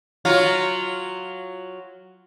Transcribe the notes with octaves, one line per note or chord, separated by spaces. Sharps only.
F#3 F4